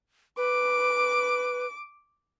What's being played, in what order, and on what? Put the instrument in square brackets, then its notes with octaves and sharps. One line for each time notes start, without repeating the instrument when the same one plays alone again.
[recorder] B4 [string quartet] D6